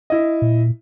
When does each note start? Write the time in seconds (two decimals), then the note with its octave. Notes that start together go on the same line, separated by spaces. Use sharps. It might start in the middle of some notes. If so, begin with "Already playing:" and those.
0.10 E4 D#5
0.42 A#2